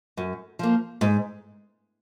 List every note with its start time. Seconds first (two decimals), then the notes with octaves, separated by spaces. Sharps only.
0.17 F#2
0.59 F3 A#3
1.01 G#2